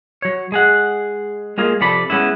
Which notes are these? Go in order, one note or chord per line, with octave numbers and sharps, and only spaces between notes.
F#3 C#5
G#3 G#4 F#5
G#3 A#3 F4 G#4
C3 F3 A4 D5 B5
G#3 B3 C#4 E4